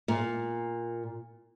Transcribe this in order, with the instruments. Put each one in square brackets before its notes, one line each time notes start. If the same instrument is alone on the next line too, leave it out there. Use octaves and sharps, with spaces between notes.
[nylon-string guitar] A#2